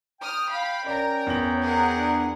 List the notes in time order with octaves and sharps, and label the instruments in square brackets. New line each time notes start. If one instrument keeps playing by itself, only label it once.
[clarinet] G5 [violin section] D#6 F6
[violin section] F5 B5
[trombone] C#4 [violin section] A#4 A#5 [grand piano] D5
[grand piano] E2 F#7
[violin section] G#4 A#4 F#5
[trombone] D4